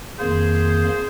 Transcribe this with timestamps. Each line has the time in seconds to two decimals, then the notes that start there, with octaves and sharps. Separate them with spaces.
0.19 F2 D#3 A#3 G#4 C5